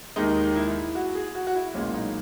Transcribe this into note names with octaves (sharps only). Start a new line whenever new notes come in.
D#2 D#3 G#3 D#4
E4
F#4
G#4
F#4
F#4
E4
B1 A#2 G#3 C#4
D#4